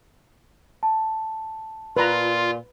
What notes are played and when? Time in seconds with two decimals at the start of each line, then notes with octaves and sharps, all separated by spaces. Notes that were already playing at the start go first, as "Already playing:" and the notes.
0.83 A5
1.97 A#2 F4 B4 A#5